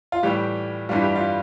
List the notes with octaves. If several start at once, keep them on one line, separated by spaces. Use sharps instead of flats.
F4
A2 E3 G3 G4
G2 E3 G3 F4
G4
F4